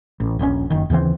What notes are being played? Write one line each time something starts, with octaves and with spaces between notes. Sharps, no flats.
A1
D#1 A#1 A#2 C#4
F#1 D#3
D#2 C#3 E3 C4